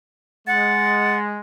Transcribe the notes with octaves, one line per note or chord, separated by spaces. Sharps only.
G#3 F#5 A6